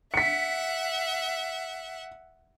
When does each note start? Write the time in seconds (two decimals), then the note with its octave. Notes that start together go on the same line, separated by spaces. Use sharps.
0.14 E5 F#5 B6 C#7